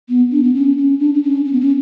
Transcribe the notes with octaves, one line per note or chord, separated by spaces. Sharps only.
B3
D4
B3
C#4
C#4
D4
D4
C#4
C#4
B3
C#4